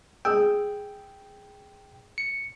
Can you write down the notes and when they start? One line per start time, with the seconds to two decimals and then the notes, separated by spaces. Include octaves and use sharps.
0.25 G#4 G5 E6
2.18 C#7